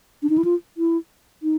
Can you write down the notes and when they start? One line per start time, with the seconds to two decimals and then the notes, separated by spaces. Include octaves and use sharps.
0.23 D4
0.30 D#4
0.38 E4
0.45 F4
0.77 E4
1.43 D#4